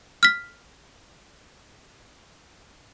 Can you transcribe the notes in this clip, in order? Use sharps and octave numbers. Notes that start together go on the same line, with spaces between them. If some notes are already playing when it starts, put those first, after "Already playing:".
F6 B6